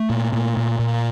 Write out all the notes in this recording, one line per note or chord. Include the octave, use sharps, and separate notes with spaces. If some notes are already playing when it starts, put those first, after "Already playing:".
Already playing: A3
A#2
A#2
A#2
A#2